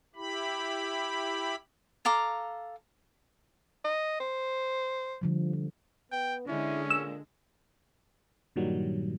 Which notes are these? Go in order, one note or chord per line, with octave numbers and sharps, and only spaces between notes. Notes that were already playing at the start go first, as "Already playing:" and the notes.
E4 G4 B5
A4 F5 A#5 D6
D#5
C5
D3 F3 G3
F3
B3 G5
D3 G#3 C#4 E4
A#2 E6
G2 A#2 D#3 F#3 G3